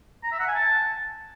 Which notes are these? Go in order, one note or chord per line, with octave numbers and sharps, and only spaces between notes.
A#5
E5
F#5
G#5
A5